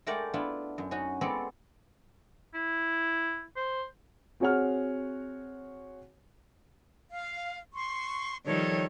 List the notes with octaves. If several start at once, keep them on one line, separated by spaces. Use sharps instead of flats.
G#3 A3 A#4 D5 F#5 G5
B3 D4 E4 F4
F#2
C#4 D#4 F#4
G#3 B3 C4 A4 C#5 D5
E4
C5
C4 F#4 G#4 C#5 F#5 F6
F5
C6 C#6
D#3 F3 G3 A4 C#5